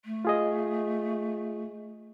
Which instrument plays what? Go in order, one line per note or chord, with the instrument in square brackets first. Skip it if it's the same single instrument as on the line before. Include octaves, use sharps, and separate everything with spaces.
[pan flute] A3
[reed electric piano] F4 G#4 D#5